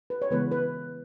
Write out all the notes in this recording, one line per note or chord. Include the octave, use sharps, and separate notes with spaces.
B4
C#5
C#3 E3 G#3 B3 B4
B4